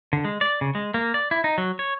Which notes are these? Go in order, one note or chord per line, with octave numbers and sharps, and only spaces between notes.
D3
G#3
D5
C#3
G#3
A#3
D5
E4
D#4
F#3
C#5